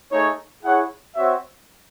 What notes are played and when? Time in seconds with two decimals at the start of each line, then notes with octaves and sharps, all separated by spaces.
0.11 A3 D#4 G#4 C#5
0.62 E4 G#4 C#5 F#5
1.15 C4 F#4 C#5 E5